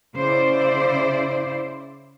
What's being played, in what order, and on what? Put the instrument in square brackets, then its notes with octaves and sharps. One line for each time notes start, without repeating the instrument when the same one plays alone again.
[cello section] C#3 E4 C5 D5